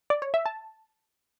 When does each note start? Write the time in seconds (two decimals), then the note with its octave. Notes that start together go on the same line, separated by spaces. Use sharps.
0.10 D5
0.22 C#5
0.34 E5
0.46 A5